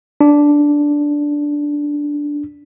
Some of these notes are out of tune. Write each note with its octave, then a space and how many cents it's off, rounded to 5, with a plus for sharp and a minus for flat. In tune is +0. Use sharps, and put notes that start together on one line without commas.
D4 -5